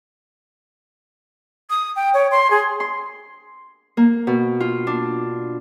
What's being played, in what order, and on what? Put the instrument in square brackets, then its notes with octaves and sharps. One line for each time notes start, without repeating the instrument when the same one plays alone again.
[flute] D#6
G5
C#5
C6
G#4
[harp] C6
A#3
B2
F4
D4